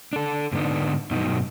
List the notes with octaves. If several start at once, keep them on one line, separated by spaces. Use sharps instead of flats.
D4 A4
G#2 D3 B3 D4 D#4
G2 B2 F#3 D#4